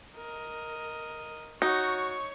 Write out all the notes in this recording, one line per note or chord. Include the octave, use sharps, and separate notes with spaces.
A#4 D#5
D#4 F#4 C#5 C#6